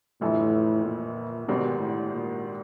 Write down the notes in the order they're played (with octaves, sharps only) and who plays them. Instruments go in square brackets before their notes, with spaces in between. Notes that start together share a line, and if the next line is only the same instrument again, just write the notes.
[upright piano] G1 F2 C3 E3 A3 [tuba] A2
[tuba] A#2
[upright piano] G#1 G#2 D#3 G3 C4 [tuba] B2
[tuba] A2
A#2